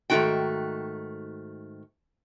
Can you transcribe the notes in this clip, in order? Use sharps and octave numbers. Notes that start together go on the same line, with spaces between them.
G#2 D#3 A3 D4 F#4 G5